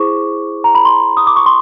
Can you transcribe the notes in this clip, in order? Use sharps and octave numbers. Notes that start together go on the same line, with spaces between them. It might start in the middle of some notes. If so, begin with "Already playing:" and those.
Already playing: E4 G#4 C5 C#6 D6
A#5
B5
C6
D#6
D6
C#6
C6